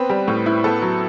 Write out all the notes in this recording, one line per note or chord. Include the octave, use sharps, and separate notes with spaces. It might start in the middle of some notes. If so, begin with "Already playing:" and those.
Already playing: B3 C4 B4
G3
A2
E4
B3 A4
F#3